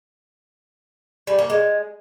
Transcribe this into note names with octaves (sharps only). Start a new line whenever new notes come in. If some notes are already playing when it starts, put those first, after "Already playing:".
G3
A#3
G#3